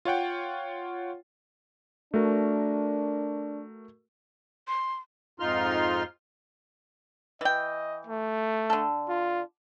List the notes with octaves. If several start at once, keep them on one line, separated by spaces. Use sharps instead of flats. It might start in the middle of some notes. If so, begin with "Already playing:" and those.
F4 C#5 F#5 G5
A3 D4 F#4 A#4
C6
F2 G#2 D#4 F4 C6 F6
E3 D#5 G5
A3
D3 A4
F4